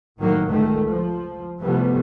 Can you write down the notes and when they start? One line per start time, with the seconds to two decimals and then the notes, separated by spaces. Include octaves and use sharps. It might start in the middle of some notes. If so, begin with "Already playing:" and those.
0.18 A2 D#3 F#3 A#3
0.47 C#2 D#3 A3
0.88 F3
1.59 C3 E3 F3 G3 A3 B3